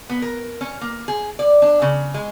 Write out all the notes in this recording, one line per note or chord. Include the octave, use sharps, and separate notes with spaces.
B3
A#4
C#4
A#3
G#4
D5
D4
C#3
G#3